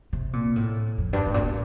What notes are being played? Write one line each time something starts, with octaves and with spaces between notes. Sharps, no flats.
C3
A#2
A2
F2
G2
A2
A#2
A2